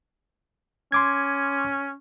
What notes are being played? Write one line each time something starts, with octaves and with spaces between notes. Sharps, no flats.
C#4 C6 D6 G#6